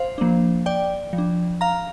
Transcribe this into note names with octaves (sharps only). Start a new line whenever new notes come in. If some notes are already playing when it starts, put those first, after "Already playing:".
Already playing: C5 F5
F3 A#3 D4
D5 G5
F3
D4
F5 A#5